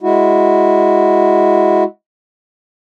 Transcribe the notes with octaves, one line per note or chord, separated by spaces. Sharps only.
G#3 E4 F#4